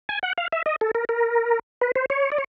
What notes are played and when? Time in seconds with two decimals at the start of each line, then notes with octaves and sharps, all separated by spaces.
0.09 G#5
0.23 F#5
0.38 F5
0.52 E5
0.66 D#5
0.81 A4
0.95 A#4
1.09 A#4
1.81 B4
1.96 C5
2.10 C#5
2.32 D5
2.38 C#5